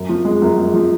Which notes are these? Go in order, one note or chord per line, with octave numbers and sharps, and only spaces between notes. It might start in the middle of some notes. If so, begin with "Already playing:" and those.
Already playing: F#2
F3
G#3
F#2
G#3
F3